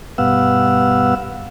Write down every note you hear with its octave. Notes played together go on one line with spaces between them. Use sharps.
G2 B2 B3 F5 F#5 E6